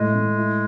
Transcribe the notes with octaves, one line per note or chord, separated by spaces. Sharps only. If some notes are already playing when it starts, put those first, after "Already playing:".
Already playing: A2 G#3
A2
E4